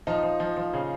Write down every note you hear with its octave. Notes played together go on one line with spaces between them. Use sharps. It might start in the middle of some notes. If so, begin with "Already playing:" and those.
F3 D#4
F3
F3
F3
C#3